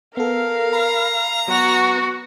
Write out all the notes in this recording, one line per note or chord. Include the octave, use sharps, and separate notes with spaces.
B3 A4 A#4 F5
A#5 B5
F#3 B3 F#4 F#5